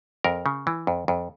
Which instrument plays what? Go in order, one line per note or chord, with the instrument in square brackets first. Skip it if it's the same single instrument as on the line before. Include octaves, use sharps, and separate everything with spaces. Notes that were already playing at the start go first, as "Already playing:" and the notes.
[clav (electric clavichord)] F2 A#4
C#3
E3
F2
F2